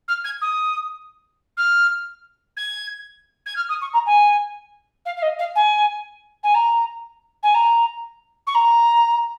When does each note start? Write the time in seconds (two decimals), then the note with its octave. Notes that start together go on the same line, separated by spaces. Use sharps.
0.08 F6
0.24 G#6
0.41 D#6
1.57 F6
2.56 G#6
3.46 G#6
3.56 F6
3.68 D#6
3.81 C#6
3.93 A#5
4.06 G#5
5.05 F5
5.16 F5
5.22 D#5
5.38 F5
5.55 G#5
6.43 G#5
6.54 A#5
7.42 G#5
7.54 A#5
8.46 C#6
8.54 A#5